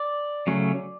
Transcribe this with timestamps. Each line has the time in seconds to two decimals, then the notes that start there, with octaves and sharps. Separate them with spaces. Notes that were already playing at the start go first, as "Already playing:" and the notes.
Already playing: D5
0.47 C#3 F#3 A3 C#4